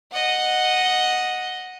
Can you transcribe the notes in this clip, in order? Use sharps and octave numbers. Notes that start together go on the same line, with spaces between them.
D#5 F#5